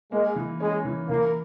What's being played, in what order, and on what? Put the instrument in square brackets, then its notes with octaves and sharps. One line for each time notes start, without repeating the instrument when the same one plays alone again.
[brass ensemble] G#3 [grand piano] A#3
[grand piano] E3
[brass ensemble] G#3 [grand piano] C#4
[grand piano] E3
[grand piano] E3 [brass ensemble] A#3